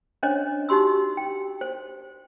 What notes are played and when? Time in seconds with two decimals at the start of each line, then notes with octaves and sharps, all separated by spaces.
0.23 C#4 D4 C5 C#5 D#5
0.69 D#4 F#4 G4 C6 E6
1.17 G5
1.61 C5